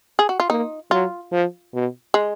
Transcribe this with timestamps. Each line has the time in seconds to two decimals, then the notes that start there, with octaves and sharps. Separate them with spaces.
0.19 G#4
0.29 F#4
0.40 F4
0.50 A#3 D#4
0.91 F#3 F4
1.32 F3
1.74 B2
2.14 G#3